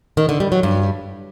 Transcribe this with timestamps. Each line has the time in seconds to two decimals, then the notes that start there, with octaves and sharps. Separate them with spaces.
0.17 D#3
0.29 D3
0.40 G3
0.52 F#3
0.63 G2